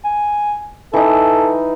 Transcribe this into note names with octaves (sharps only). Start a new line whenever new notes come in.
G#5
E3 D#4 A4